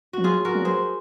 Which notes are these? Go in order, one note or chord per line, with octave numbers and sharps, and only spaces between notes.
F3 F#4
F#3 F4 G#4
F#4 A#4
F#3
G#4 C5